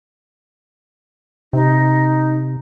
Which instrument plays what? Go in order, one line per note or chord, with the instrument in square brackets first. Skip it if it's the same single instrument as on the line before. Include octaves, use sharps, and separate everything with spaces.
[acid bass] C3 [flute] D#4